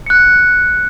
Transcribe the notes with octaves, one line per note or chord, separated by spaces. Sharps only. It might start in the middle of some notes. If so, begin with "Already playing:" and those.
F#6 C#7